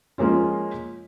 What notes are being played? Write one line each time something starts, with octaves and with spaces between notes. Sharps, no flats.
F3 G#3 A#3 C#4 F4